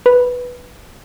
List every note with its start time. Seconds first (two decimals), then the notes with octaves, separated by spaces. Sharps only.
0.06 B4